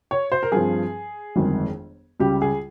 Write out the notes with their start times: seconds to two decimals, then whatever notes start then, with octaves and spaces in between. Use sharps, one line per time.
0.11 C#5
0.32 C5
0.43 A#4
0.52 G2 F3 C4 G#4
1.36 G1 F2 D#3 G#3
2.20 C#2 C#3 G3 G4
2.42 G#4